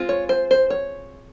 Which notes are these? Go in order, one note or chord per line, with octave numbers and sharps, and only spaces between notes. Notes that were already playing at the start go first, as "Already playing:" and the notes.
Already playing: G#3 C4 F4
C#5
C5
C5
C#5